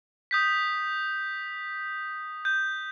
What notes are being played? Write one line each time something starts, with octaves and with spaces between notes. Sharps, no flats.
D#6 G6 B6
G6